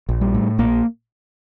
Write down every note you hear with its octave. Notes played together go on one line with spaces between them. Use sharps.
A#1
G3
A2
A#1 A#3